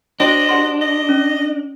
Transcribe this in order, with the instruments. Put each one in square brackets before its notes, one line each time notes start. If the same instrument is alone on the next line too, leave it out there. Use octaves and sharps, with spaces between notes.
[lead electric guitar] D4 [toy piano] F#4 C5 G5 [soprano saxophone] D#5
[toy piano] G4 F#5 C6
[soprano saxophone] D#5
[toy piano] C#4